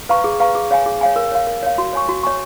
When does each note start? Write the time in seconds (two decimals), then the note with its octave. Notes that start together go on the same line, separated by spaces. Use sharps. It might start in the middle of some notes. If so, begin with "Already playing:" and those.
0.09 B4 F5 A#5 C#6
0.24 G#4
0.40 B4 F5 A#5 C#6
0.55 G#4
0.71 C#5 F5 G#5
0.86 G#4
1.01 C#5 F5 G#5
1.16 A#4
1.32 C#5 F5
1.47 A#4
1.63 C#5 F5
1.78 F#4
1.93 C#5 G#5 C#6
2.09 F#4
2.23 C#5 G#5 C#6